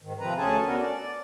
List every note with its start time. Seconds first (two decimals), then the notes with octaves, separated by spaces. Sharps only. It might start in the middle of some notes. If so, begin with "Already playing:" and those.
0.02 G#2 D#3
0.20 C3 F3 C4 B4 A#5
0.38 D2 C#4 G#4 A4 G#5 A5
0.66 B3 C#4 D4 F#4 A4 A#4
0.80 D5